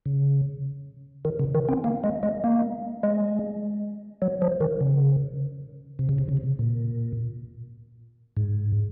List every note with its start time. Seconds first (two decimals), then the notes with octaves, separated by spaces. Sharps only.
0.06 C#3
1.25 D#3
1.39 C#3
1.55 D#3
1.69 C4
1.84 A#3
2.04 G#3
2.23 G#3
2.44 A#3
3.03 G#3
4.22 F#3
4.42 F3
4.61 D#3
4.81 C#3
5.99 C3
6.09 C#3
6.18 C3
6.29 C#3
6.37 C3
6.59 A#2
8.37 G#2